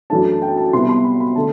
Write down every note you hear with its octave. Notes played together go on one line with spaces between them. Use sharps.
F#2 E3 A3 D4 A5
G5
A5
C3 G3 B3 E4 C6
B5
C6
B5
B5
D3 A3 A5